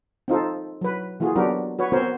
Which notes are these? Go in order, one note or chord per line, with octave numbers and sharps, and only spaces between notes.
C4 D#4 F4 A4
F#3 B4
E3 A#3 F4 F#4 G#4
F#3 B3 D4 F#4 G4 A#4
F#4 B4 C#5
B3 C4 F#4 A#4 C5 C#5